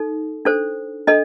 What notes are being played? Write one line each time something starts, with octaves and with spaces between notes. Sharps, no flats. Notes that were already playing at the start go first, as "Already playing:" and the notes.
Already playing: D#4 A4
D4 A4 C5
D4 A4 D#5